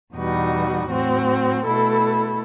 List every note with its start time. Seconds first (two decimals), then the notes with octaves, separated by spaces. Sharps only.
0.15 E2 B2 G3 D#4 F#4
0.89 A2 F#3 C4 F#4
1.63 B2 A3 E4 A4